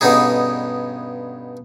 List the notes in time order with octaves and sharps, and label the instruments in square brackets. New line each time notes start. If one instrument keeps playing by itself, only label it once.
[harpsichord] G2 B2 D3 C#4 D#4 G#4